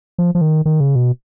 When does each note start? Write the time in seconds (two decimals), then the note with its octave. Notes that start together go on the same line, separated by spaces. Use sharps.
0.18 F3
0.35 F3
0.41 D#3
0.65 D#3
0.80 C#3
0.95 B2